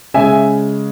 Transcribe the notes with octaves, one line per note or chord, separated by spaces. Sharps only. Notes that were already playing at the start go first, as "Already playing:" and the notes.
C#3 G#3 E5 G#5